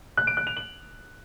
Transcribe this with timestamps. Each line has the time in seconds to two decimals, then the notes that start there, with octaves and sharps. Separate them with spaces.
0.17 F#6
0.27 D7
0.37 F#6
0.47 F7
0.57 F#7